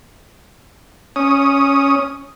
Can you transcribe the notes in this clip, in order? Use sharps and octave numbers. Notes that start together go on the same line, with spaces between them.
C#4 D#6